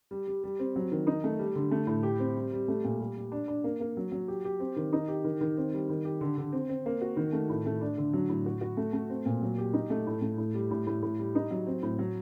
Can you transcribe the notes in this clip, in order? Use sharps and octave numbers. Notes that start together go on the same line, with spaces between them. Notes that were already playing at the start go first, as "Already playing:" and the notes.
G3
G3
G3
C4
F#3
D#3
D#4
A3
G3
D3
A3
A2
G4
C4
G3
G3
A3
A#2
G3
G3
D4
D4
A#3
A#3
F#3
F#3
G4
G4
C4
D#3
D#4
G4
D#3
D#3
C4
G3
D#3
G4
D3
D3
C4
C4
A#3
F#4
D#3
A3
A2
A3
D4
D3
F#3
A2
F#4
F#4
A3
A3
C4
A#2
F#3
G4
D#4
A3
A2
A3
A2
G3
A2
A2
A2
G3
D#4
F#3
C4
A2
F#3